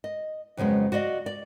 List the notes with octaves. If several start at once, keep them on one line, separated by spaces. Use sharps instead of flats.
D#5
F2 C#3 F#3 G#3 B3
F#4 D5 D#5 F5
D5